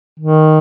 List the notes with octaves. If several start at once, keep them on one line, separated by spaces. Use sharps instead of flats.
D#3